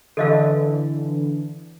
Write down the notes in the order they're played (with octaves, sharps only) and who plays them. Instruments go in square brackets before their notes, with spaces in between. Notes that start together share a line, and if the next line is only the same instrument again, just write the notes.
[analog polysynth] D3 E3 [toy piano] A4 D#5 F5